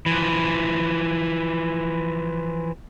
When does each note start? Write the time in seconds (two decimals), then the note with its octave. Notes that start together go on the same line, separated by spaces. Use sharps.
0.06 E3 F3